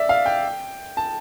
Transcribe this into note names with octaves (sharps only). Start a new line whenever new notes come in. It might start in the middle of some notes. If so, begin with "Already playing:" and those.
Already playing: D5 E5
F5
G5
A5